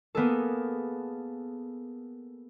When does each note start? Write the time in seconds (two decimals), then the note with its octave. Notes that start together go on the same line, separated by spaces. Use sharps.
0.15 A#3 B3 G#4 A4